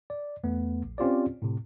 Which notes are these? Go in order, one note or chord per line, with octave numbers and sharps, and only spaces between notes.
D5
E2 A3 B3
A#1
C4 C#4 F4 G4 C5 D5
A2 C3